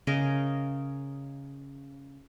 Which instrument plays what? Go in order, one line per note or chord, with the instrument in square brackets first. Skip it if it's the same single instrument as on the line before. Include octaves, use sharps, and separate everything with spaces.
[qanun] C#3 G#4 A#4 D#5